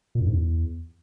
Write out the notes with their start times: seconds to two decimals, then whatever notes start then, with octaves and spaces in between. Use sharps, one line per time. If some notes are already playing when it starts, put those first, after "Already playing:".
0.15 A#2
0.21 F#2
0.26 G#2
0.32 E2